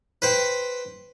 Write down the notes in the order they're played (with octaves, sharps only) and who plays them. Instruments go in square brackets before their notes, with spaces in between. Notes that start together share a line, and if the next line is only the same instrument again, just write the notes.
[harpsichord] B4 C5 G5